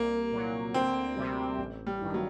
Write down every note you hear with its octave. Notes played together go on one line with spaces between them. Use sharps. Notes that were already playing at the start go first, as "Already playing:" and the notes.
Already playing: C2 A#3
A#2 F#3
D2 C4
C3 G3
A1
G3
G2 D#3
F#3